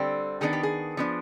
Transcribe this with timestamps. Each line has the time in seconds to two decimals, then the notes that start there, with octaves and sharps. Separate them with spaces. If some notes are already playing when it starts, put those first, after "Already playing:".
Already playing: D3 G3 C4
0.41 D#3 B3 D4 G#4
0.53 G4
0.63 G#4
0.97 F3 B3 D4